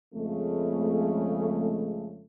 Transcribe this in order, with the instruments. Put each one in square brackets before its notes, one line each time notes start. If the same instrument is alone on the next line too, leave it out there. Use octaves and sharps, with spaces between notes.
[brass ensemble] F2 C#3 G#3 A3